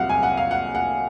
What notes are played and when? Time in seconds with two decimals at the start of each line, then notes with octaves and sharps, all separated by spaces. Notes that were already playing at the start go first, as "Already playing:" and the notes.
Already playing: C2 A#2 F#3 F5 F#5
0.09 G#5
0.23 F#5
0.37 F5
0.51 F#5
0.75 F#5